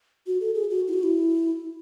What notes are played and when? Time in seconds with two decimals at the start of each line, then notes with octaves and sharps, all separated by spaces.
0.27 F#4
0.41 A4
0.55 G#4
0.70 F#4
0.88 E4
0.93 F#4
1.03 E4